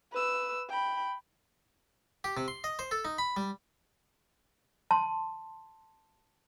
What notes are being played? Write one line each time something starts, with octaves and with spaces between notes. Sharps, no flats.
B4 E6
G5 B5
G4
C3
C6
D#5
C5
A4
D#4
B5
G3
A5 C6